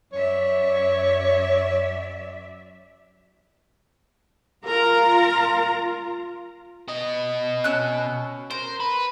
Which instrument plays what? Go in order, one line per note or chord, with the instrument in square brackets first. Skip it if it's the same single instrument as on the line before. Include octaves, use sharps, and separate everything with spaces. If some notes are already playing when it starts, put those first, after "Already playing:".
[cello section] F#2 D5 E5 [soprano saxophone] C#5
[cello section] F4 [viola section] A#4 A#5
[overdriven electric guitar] B2 D#5
[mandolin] C#4 E6 F#6
[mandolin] A#4 [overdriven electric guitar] C5
[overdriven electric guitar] B4